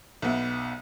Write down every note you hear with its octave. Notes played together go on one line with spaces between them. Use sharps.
B1 B3 E5